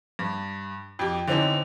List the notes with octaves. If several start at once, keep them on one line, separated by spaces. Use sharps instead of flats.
G2
F2 G4
D3 E3 C4 C#4 D#4